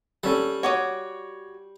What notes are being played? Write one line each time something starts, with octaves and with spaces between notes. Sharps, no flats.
G3 C#4 A4
F#4 C#5 D6 D#6